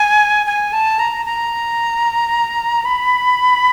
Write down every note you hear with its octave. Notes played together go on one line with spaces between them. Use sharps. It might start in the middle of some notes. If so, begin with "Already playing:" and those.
Already playing: G#5
G#5
A5
A#5
A#5
B5